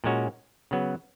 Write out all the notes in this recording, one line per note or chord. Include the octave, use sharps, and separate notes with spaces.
A#2 G#3 C#4 F#4
C#3 F#3 B3